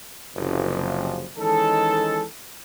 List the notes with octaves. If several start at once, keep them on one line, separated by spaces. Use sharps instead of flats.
F#1 C3 F3
D#3 E3 G#3 C#4 D#4 A4